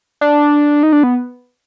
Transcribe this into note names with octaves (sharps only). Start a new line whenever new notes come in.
D4
D#4
D4
B3